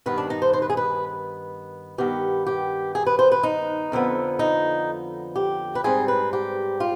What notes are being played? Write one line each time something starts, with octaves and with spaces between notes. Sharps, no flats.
G2 D#3 B3 B4
D4
D#4
C5
C5
B4
G#4
B4
G2 D#3 B3 G4
G4
G#4
B4
C5
B4
D#4
F2 D3 F3 B3
D#4
G4
B4
G#2 G3 C4 G#4
B4
G4
F4